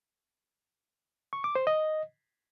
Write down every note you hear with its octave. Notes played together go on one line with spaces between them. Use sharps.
C#6
D6
C5
D#5